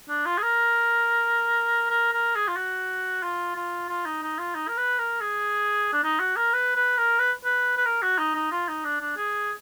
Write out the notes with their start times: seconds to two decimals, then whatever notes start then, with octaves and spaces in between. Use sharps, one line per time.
0.09 D4
0.26 F4
0.38 G#4
0.43 A#4
1.90 A#4
2.13 A#4
2.35 G#4
2.48 F4
2.57 F#4
3.23 F4
3.56 F4
3.89 F4
4.05 D#4
4.22 D#4
4.39 F4
4.55 D#4
4.68 A#4
4.77 B4
4.99 A#4
5.21 G#4
5.93 D4
6.03 D#4
6.20 F#4
6.36 A#4
6.53 B4
6.76 B4
6.98 A#4
7.19 B4
7.45 B4
7.77 B4
7.86 A#4
8.02 F#4
8.18 D#4
8.34 D#4
8.51 F4
8.68 D#4
8.84 D4
9.01 D4
9.17 G#4